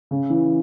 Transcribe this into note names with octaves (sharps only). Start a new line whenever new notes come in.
C#3
E3